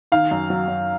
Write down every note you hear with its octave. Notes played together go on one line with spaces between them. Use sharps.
D#3 F5
F#2
F#3
F#2